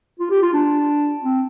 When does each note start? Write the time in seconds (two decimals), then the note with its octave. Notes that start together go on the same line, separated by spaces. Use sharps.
0.20 F4
0.31 G4
0.42 F4
0.54 D4
1.24 C4